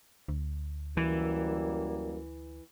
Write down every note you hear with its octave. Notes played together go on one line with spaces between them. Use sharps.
D2
F#2 E3 G3 A#3